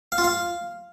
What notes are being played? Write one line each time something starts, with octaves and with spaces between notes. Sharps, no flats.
F5
F4
F5